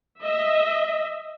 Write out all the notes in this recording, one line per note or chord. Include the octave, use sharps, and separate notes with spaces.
D#5 E5